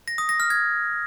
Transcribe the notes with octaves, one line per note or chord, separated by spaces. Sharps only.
A#6
D#6
A#6
F6
G#6